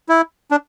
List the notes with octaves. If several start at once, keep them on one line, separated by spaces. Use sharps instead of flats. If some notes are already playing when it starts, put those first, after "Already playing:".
E4
D4